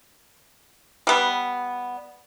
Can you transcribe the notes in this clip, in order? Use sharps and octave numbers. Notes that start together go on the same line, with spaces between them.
G3 B3